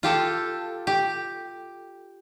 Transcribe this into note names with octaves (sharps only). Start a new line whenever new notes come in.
F4 G4 A4
G4